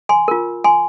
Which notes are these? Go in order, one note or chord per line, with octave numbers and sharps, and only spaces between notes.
G#5 C6
F4 A#4
G#5 C6